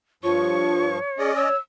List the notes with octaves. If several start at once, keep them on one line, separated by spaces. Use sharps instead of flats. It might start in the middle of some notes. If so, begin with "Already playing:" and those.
G2 F3 F4 C#5 C#6
C#4 G#4 D5 D#5
C#5 E6